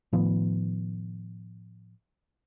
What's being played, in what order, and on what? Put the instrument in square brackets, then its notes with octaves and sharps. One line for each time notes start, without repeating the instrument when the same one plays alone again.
[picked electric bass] A2 D#3 F3 B3